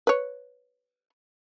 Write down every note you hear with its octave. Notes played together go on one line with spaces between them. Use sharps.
B4 C#5